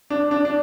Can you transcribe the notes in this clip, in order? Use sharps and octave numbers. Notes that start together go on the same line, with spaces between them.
D4
D4
D4